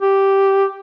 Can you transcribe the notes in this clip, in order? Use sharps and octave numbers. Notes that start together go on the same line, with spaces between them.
G4